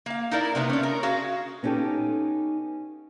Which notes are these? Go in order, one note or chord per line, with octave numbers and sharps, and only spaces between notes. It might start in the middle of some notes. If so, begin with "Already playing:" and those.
A#3 F5
D#4 E4 A#4 D5
C3 A#3 B3
C#4 D4
A#4
F#4 G#4 F5
B3 C#4 D#4 G4 A4